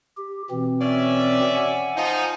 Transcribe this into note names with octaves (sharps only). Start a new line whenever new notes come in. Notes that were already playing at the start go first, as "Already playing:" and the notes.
G4
B2 E3 C4
C#4 D5 E5
F#5 G#5
F3 D#4